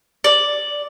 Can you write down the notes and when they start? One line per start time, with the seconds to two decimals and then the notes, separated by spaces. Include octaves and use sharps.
0.24 D5